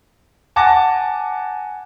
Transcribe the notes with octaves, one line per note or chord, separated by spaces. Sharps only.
F#5 G#5 A5 D6 A#6